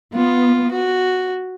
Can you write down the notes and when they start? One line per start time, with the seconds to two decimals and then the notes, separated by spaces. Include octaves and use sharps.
0.15 B3 F4
0.71 F#4